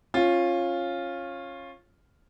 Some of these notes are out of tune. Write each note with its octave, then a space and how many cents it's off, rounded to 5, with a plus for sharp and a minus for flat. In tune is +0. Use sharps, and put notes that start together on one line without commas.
C#4 -20 F4 +0